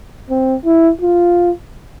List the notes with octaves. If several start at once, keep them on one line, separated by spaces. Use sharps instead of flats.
C4
E4
F4